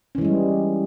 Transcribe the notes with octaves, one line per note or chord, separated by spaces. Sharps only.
E3 G3 G#3 C#4